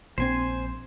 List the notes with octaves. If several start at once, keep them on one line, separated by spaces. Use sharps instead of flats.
A#1 C#3 C4 C5 G#5